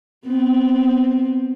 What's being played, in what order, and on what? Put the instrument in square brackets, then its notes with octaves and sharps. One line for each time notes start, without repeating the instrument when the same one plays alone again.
[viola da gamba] B3 C4